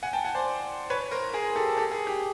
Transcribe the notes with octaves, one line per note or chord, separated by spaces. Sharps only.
F#5 G#5
G5 A5
F#5 G#5
C5 D5
B4 C#5
A#4 C5
G#4 A#4
G4 A4
G4 A4
G#4
G4